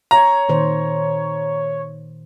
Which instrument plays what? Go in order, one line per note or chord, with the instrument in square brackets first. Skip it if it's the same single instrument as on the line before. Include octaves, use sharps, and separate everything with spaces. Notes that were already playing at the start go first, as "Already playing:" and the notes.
[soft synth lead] C#5 [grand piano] A#5
[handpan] A#2 D#3 C5